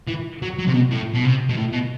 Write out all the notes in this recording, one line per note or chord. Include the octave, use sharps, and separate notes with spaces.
E3
F#3
F#3
C3
B2
A2
B2
C3
B2
A2
B2